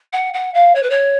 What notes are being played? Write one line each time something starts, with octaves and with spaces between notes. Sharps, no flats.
F#5
F#5
F5
C#5
B4
C#5